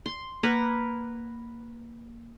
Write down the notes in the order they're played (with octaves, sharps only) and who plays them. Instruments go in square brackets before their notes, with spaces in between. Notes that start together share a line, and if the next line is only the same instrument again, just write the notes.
[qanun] C6
[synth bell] A#3 [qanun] A#4 B4 F#5